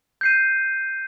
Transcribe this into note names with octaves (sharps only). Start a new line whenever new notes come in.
G6 C7 D#7